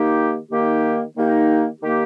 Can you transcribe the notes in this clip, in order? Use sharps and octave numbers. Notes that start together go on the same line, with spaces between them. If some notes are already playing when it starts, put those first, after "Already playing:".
Already playing: D#3 A#3 D#4 G4
D#3 A#3 D#4 G4
D#3 A#3 D#4 G4
D#3 A#3 D#4 G4